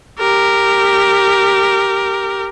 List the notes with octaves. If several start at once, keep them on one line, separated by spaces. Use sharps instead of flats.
G4 A#4